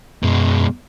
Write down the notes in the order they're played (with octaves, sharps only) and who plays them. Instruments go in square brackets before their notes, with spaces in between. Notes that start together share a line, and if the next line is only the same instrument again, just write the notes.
[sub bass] F#2 [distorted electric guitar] B2 G#3